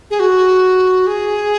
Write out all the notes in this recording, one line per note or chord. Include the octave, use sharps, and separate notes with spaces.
G#4
F#4
G#4